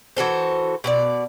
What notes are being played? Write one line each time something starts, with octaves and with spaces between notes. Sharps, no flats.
E3 F#4 A4 C5
B2 G#4 D5